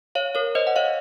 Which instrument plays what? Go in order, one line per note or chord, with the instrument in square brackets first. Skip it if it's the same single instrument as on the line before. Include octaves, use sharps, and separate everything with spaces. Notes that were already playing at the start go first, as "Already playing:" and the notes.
[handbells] C#5 F5
A#4 C#5
C5 D#5
F#5
C#5 F5